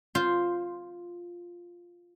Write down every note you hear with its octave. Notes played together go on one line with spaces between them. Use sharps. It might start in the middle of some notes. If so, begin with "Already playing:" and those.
F4 C5